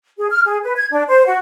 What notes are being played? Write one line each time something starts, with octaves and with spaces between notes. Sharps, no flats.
G#4
F6
G#4
B4
G#6
D4
C5
F#4